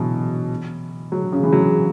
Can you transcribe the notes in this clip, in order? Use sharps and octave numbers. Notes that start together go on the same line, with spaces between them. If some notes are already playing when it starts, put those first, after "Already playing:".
Already playing: B2 E3 F#3
F#3
C#3
E3
F#3